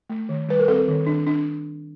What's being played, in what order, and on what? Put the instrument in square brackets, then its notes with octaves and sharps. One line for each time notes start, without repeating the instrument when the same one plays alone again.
[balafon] A3
D#3
G3 B4
A#4
C4 A4
D#3
D4
D4